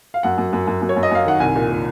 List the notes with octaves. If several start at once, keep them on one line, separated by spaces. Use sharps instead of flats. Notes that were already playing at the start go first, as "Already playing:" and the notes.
F5
F#2 F#5
F#2
F#2
F#2
F#2
C#5
F#2
D#5
F#2 F5
D#3 F#5
C2 G#5
A#2
A#2